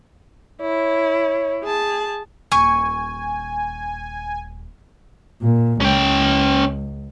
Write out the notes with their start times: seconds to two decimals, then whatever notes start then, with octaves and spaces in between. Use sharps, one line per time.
0.61 E4 C#5
1.63 G#4 A5
2.52 D#1 G#5 C#6
5.42 A#2
5.81 C#2 C#4 G5